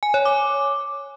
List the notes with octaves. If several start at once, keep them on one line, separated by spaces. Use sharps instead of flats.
G#5
C#5
D6